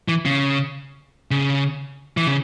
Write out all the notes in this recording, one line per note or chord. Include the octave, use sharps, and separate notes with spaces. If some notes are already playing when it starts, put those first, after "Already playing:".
E3
C#3
C#3
E3
C#3